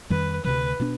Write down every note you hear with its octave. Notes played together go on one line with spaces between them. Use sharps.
F2 D#3 G3 B4
D2 C3 F3 B4
B2 B3 D4